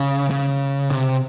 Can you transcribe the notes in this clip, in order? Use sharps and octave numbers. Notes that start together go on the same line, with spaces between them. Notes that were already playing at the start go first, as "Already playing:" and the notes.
Already playing: C#3
C#3
C3